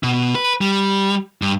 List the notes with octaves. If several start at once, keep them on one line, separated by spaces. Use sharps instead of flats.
B2
B4
G3
G2